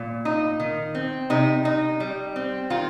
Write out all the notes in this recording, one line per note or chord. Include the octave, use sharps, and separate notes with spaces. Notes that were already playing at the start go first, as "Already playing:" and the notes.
Already playing: A#2
D#4
D#3
C4
C3 D#4
D#4
G3
C4
D#3 F4